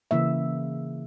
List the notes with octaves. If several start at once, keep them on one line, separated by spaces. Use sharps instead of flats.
C#3 E3 A#3 E5